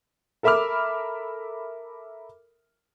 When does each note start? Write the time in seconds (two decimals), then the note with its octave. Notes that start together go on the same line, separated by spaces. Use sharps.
0.43 A4 A#4 E5 B5 D6 F6